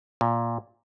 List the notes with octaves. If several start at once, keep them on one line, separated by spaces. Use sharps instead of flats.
A#2